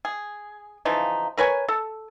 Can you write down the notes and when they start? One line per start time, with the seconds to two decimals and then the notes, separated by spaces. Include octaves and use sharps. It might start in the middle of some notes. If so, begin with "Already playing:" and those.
0.05 G#4
0.85 C#3 E3 F3 D#4
1.37 A#4 B4 C#5 G#5
1.68 A4